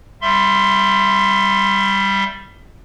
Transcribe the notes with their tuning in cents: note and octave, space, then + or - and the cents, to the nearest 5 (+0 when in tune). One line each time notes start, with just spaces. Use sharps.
G3 +0 E5 +20 C6 +0